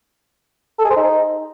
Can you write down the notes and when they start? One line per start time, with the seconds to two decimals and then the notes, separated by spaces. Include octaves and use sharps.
0.79 A4
0.85 G#4
0.90 C5
0.96 D#4